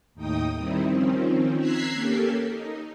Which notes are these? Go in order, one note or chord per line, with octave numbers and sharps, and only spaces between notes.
D#2 A2 D#4 G5 D#6
D#3 G3 C4 D#4 E4
D#3 F3 C4 C#4
A#5 E6 F#6 G#6 B6 C7
A#3 C#4 G4 A4 A#4
D#4